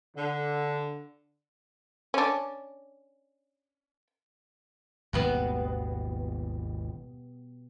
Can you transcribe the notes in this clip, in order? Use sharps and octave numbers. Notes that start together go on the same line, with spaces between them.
D3
C#4 D4
G#1 D#2 B2 F#3 G3 B3